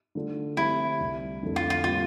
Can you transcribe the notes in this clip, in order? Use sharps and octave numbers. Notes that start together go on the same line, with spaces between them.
D3 A3 D4 F4 A4
D3 F3 A3 C4 E4 G4
C2 C3 G3
F2 D3 A3 E4 A4
F4
F4
A#2 G3 C4 E4 F4